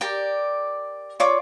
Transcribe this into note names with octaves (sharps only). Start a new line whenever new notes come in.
G4 A#4 D5 G5
F4 C#5 D5 D6